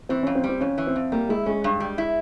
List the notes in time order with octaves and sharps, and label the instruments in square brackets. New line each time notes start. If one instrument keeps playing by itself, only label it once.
[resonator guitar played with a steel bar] E3 [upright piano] C4
[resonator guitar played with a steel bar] F2 [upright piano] C#4
[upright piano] C4
[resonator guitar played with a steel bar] G3
[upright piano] C4
[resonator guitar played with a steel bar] F2 [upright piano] C#4
[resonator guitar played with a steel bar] E3
[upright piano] C4
[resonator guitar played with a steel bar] F2
[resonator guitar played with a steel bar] G3 [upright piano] A#3
[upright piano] G#3 [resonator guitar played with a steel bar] E4
[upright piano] G#3 [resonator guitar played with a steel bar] C#4
[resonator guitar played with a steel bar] G2
G3
E4